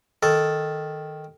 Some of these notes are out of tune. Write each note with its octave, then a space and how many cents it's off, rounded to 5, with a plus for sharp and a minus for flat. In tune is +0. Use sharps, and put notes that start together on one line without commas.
D#3 +0 A4 +0